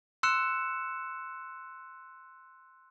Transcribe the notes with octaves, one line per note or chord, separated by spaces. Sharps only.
C6 E6 F#6 C#7 E7